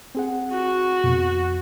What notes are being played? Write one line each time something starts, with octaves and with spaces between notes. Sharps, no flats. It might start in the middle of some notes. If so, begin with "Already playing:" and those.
C4 G#4 F#5
F#4
F2 B2